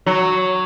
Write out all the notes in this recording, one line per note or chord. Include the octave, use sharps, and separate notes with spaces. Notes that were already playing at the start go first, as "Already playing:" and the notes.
F#3